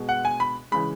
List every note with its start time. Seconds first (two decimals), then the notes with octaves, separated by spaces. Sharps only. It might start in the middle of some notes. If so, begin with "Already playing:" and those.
Already playing: B2 G#3
0.09 F#5
0.25 G#5
0.40 B5
0.72 C#3 E3 G#3 B5